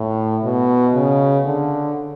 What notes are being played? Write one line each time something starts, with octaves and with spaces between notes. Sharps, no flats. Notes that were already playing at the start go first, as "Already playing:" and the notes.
Already playing: A2
B2
C#3
D3